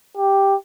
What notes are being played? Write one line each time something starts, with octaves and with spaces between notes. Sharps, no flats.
G4